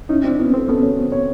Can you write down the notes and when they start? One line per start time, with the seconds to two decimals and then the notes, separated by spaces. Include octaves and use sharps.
0.09 C#4 D#4 E4
0.24 C4 D4 E4
0.39 B3 C#4 E4
0.54 C4 A4
0.68 B3 C#4 A4
0.83 C#5
0.98 C4
1.12 C#5